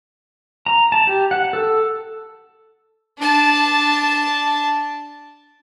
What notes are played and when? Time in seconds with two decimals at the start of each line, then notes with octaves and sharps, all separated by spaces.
0.66 A#5
0.92 A5
1.07 G4
1.31 F#5
1.53 A4
3.18 D4 A5